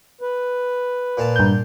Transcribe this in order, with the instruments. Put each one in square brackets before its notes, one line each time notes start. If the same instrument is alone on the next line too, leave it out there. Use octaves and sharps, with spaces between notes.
[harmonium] B4
[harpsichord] A#2 F5 A5
[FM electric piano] G2 G6